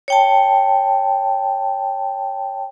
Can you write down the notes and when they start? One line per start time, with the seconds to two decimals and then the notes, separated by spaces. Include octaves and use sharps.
0.08 C#5 G5 A5